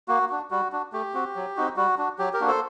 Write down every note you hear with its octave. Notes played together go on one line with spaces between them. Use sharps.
A#3 F#4
D4 F#4
G3 F#4
D4 F#4
A3 G4
C4 F#4
F#3
C4 D#4 F#4
G3 F#4
D4 F#4
F#3 G4
G4 A#4
A#3 D4 F#4
A4 C5